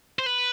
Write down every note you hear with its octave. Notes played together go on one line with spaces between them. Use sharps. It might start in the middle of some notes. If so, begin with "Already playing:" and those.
C5
B4